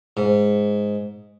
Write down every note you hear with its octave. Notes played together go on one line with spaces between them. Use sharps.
G#2